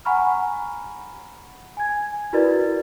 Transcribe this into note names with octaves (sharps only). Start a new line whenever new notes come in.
F#5 G#5 A#5 B5 C#6 F6
G#5 G#6
E4 F#4 A#4 B4 D5 A6